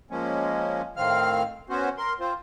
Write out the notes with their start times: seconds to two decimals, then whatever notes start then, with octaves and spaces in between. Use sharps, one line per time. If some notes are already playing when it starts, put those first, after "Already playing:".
0.11 F3 G#3 A#3 C#4
0.97 A2 D#3 C4 F5 F6
1.69 B3 C#4 F#4 C5
1.97 A#4 C6
2.20 C4 F4 C5